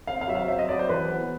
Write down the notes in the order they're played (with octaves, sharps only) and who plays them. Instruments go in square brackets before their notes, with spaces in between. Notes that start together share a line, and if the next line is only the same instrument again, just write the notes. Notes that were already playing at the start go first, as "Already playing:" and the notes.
[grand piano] C4 F5
F5
F#3 E5
F5
C4 E5
D#5
F#3 D5
C5
E3 B4
B3